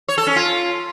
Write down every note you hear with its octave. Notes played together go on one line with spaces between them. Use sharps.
C#5
A4
C#4
F4